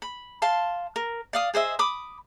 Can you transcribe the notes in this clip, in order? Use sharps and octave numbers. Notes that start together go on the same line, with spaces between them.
B5
F5 A5 C6
A#4
D5 F5 D#6
G#4 C5 D#5 E5
B5 D6 D#6